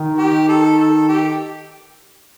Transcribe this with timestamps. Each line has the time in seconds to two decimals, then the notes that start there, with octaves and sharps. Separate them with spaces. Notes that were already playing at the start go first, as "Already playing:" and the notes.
Already playing: D#3
0.18 G4
0.48 A4
0.78 A4
1.09 G4